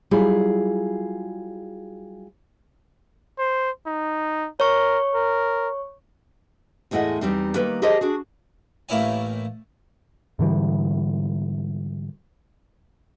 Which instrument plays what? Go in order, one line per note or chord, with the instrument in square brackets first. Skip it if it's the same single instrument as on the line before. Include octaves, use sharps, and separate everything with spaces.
[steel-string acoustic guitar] F#3 G3 E4 F4 G#4
[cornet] C5
D#4
[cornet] A#4 [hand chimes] C#5 C#6
[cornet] A#4
[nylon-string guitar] E2 A2 G#3 E4 D#5 F#5
E2 G3 C4 D#4
D#3 G3 A#3 B4
G4 G#4 A#4 C5 D#5 A5
D4 F#4 G#4
[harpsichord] A1 A3 A#3 E4 C#5 G#5
[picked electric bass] G#2 D3 E3 G3